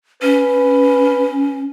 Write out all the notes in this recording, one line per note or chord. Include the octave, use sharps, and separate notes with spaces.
C#4 B4